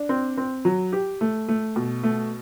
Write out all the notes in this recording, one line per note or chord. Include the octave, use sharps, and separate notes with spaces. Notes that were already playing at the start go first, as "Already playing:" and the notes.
Already playing: D4
C4
C4
F#3
G4
A3
A3
B2
A3